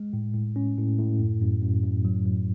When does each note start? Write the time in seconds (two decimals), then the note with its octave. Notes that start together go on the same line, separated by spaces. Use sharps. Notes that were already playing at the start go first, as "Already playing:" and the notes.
Already playing: G#3
0.13 A2
0.35 A2
0.56 C#4
0.77 A2
0.99 A2
1.20 F#2
1.41 F#2
1.62 F#2
1.83 F#2
2.05 F#3
2.26 F#3